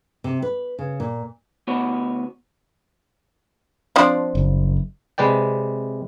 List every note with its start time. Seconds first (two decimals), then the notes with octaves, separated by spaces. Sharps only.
0.24 C3
0.42 B4
0.79 C#3
1.00 A#2
1.67 D2 B3 F#4 C#5
3.96 F3 C4 D4
4.35 F#1
5.18 C3 G#3 B4 D5 G5